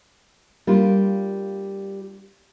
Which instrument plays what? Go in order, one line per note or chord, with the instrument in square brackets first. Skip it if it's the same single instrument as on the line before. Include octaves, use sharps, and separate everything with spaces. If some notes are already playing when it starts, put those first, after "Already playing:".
[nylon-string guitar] G3 A#3 D4 F4